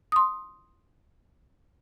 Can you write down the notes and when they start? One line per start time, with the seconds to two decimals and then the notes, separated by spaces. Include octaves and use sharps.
0.12 C6 D#6